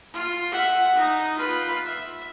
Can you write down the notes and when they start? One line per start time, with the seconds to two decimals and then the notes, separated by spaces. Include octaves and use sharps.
0.13 F4
0.52 E5 F#5
0.95 D#4
1.38 F4 B4
1.85 E5